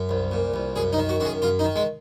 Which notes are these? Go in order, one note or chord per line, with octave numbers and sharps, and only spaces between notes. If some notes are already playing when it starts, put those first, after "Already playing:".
Already playing: F#2
C2
A#2
C2
F#2 G#4
D#4
D#3
F#4
F#2 F#4
G#4
F#2 F4
D#4
D#3
G#3